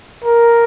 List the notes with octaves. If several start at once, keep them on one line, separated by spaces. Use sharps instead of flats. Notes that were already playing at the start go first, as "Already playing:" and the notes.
A#4